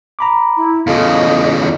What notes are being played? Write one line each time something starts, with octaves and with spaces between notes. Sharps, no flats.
A#5 B5 D6
E4
E2 C#3 F4 A4 D#5 F5